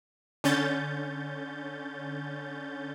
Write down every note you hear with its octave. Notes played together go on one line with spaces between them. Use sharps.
D3 C#4 G6 A6